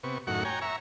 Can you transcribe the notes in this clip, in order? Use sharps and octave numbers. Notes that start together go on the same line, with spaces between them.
C3 B3 C#6
F#2 A2 D#3 F#4 F#5 C#6
C#5 G5 G#5 A#5
E5 A#5 C#6